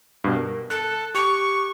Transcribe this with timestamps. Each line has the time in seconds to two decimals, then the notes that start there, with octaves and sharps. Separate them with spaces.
0.24 G2 B2
0.36 A#4
0.70 A4 A5 F#6
1.14 G4 C#6 D6